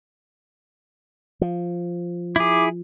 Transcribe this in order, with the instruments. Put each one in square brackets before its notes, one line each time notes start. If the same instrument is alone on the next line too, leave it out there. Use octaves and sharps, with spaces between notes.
[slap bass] F3
[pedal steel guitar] E4 G#4 [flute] D6